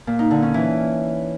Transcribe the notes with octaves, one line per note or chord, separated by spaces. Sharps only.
A#2
D#4
D3
C#4
E3